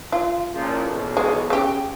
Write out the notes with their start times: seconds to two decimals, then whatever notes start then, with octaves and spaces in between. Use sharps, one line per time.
0.12 F4
0.53 F#1 A#2 F3
0.85 B1 E2 B2
1.17 G#3
1.50 C#3 G4